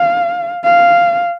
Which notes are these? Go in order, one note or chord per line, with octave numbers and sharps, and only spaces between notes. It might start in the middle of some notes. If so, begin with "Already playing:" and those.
Already playing: F5
F5